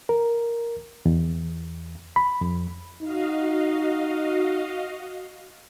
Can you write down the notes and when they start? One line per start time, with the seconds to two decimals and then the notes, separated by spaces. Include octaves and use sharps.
0.09 A#4
1.06 E2
2.16 B5
2.41 F2
3.02 D#4 F#4 D#5 F5